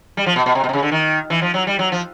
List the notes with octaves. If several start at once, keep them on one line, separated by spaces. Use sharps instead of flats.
G3
F3
B2
B2
C3
B2
C3
C#3
D3
D#3
E3
F3
F#3
G3
F#3
F3